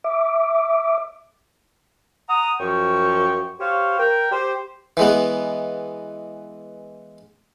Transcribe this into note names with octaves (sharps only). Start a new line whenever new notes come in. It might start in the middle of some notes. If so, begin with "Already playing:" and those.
E5 D6
F#5 A#5 D#6
F#2 F3 G5 C#6
G4 C5 C#5 F5
A#4 G5
G4 C5
E3 G#3 B3